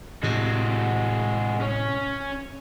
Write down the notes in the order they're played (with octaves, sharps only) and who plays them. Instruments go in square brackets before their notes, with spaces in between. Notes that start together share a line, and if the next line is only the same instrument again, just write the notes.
[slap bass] A2 C3 [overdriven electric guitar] G#3 F#4
[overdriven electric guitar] C#4 C#5